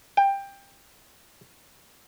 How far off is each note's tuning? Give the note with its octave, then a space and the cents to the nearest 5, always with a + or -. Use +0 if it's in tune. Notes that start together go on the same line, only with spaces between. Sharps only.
G5 +15